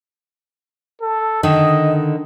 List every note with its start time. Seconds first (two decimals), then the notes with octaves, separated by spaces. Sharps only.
1.01 A4
1.43 D3 D#3 D#5